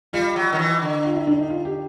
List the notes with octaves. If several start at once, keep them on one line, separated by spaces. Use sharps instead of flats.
G3 F4
F#3
D#3
E3
D3
F4
E4
D4
D#4
F4
G4